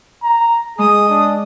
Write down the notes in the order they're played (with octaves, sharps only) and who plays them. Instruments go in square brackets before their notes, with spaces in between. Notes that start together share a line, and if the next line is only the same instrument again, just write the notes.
[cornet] A#5
[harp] G#3 [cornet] G#4 [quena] D#6
[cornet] D4